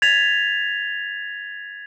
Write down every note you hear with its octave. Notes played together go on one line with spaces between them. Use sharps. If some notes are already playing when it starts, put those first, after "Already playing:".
G#6 A6 B6 F7